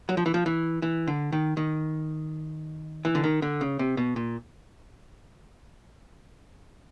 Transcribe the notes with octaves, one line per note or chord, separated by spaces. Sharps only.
F#3
F3
E3
F3
E3
E3
D3
D#3
D#3
E3
D3
D#3
D3
C#3
C3
B2
A#2